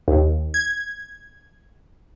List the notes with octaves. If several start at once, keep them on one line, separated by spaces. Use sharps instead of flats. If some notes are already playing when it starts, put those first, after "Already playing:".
D#2
G#6